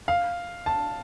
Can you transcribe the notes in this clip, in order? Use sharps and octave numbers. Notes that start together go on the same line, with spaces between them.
F5
A5